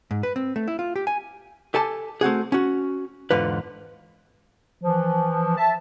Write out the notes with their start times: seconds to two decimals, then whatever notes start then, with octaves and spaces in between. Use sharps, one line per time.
0.11 G#2
0.23 B4
0.36 C4
0.56 A3
0.68 E4
0.79 F4
0.96 G4
1.07 G#5
1.74 G4 A4 G#5 A5
2.21 A3 C4 F#4 G#4
2.52 C#4 F#4
3.31 E2 G#2 D3 F4 B4
4.82 E3 F3
5.56 E5 A5